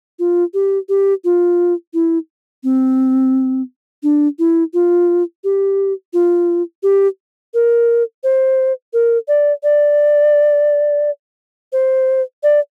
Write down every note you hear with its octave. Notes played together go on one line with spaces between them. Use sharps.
F4
G4
G4
F4
E4
C4
D4
E4
F4
G4
F4
G4
A#4
C5
A#4
D5
D5
C5
D5